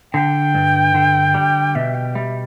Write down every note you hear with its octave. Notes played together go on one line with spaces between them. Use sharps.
D3 G5
G2
D3
G3
B2 E5
G5
G3 E5